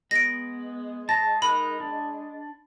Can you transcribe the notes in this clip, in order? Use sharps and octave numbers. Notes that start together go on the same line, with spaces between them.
G#3 B3 A#6 D7
A5 C6 A#6
D#4 A#4 B5 F#6
D4